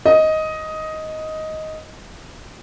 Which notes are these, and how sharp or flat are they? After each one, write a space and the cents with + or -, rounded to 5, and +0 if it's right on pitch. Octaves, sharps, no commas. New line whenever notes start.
D#5 +10